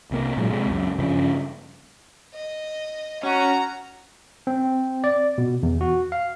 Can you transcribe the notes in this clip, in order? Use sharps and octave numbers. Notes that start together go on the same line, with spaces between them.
C2 C3 A#3
A#2 F#3 G#3
C3 G#3
C#2 F#2
G2 C#3 F3
D#5
C#4 F#4 A#5
C4
D5
B2
E2
F#4
F5